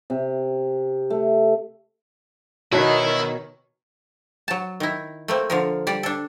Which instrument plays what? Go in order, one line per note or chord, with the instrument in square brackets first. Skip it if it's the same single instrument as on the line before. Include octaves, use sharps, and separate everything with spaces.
[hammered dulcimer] C3
A3
[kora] B2 F#5 [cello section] D#3 [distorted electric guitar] E4 [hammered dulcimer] C#5
[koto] F#3 A5
D#3 E4
A3 A#3 C4
D3 F3 A#4
G3 D5
D4 A4